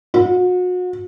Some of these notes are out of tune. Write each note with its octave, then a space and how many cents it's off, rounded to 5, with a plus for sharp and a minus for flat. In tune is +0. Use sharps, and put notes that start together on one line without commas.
F#4 -35